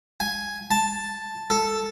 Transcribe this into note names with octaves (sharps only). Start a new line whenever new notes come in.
G#5
A5
A4